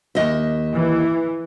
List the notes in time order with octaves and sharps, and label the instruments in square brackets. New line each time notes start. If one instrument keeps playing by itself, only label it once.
[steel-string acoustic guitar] D#2 D#5 E5
[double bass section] E3